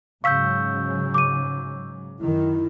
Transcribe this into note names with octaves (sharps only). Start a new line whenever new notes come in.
G#2 C#3 F#3 F5 C#6 E6 G6 B6
D6 D#7
F#2 D#3 E4